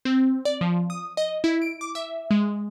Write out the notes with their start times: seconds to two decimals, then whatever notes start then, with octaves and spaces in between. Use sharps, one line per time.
0.05 C4
0.45 D5
0.61 F3
0.90 D#6
1.17 D#5
1.44 E4
1.62 D7
1.81 D6
1.95 E5
2.31 G#3